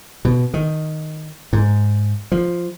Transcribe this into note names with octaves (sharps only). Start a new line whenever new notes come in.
B2
D#3
G#2
F3